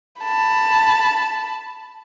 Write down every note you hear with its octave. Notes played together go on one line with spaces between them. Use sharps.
A5 B5